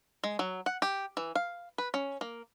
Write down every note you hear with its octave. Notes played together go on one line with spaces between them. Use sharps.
G#3
F#3
F#5
G4
E3
F5
B4
C#4
A#3